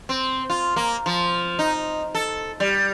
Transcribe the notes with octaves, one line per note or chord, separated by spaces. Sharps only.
C4
F4
A#3
F3
D#4
A4
G3